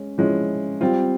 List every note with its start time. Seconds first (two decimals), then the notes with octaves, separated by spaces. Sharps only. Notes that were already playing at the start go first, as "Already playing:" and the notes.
Already playing: G#3 C#4
0.18 F3 G#3 C#4 E4
0.81 G3 C4 F4